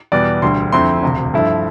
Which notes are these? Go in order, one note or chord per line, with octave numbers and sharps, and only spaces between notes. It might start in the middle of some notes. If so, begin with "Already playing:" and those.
E2 B2 G3 B3 D5
E1 D2 D3 G3 C6
F2 D3 A3 C4 E4 C6
E1 D2 C3
G2 F3 A3 E4